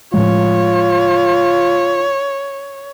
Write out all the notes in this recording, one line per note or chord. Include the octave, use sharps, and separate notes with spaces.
A2 F3 G#3 F4 C#5